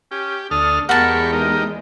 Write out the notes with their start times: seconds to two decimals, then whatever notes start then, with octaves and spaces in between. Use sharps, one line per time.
0.11 C#4 G4
0.51 D2 D4 A4 D#6 F6
0.89 E2 G#3 G4 A#4 F#5 A5 B5 C#6
1.32 D#4 G4 A#4